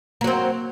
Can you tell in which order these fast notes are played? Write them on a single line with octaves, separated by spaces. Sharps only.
A#3 F#3 C4